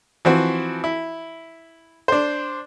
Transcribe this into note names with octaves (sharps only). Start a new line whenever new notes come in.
E3 F3 C4 F#4
E4
D4 C5